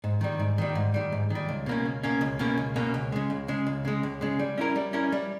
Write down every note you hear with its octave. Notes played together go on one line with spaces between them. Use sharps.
G#2
D#3 G3
G#2
D#3 G3
G#2
D#3 G3
G#2
D#3 G3
C#2
B2 A#3 C#4
C#2
B2 A#3 C#4
C#2
B2 A#3 C#4
C#2
B2 A#3 C#4
C#2
C#3 G#3
C#2
C#3 G#3
C#2
C#3 G#3
C#2
C#3 G#3
G3
C#4 E4 A#4
G3
C#4 E4 A#4
G3